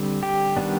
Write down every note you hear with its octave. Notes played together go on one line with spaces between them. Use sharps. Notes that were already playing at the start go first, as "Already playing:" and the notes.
Already playing: D3 G3 C4
G4
D#3 G3 B3 D4